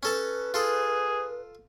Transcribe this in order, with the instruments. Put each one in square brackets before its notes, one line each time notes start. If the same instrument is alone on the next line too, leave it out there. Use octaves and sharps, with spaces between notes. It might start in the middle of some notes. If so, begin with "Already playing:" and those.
[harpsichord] C#4 A4 A5 [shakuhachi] B4
[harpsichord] F4 A4 [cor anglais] G#4